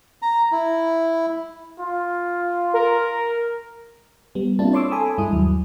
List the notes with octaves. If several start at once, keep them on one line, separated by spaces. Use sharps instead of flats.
A#5
E4
F4
A#4
G3 B3
A#3 C4 D4 E4 F4 A5
C#5 C6 D6 E6
A4 G#5 B5 D#6
G2 G#3 E4 D#6
D#2 F#3